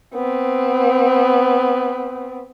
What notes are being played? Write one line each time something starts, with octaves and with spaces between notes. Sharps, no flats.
B3 C4